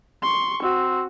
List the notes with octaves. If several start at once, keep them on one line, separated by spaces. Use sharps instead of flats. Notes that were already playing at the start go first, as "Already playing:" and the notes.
C6 C#6
C4 F#4